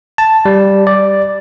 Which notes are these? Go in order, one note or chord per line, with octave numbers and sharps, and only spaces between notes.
A5
G3
D5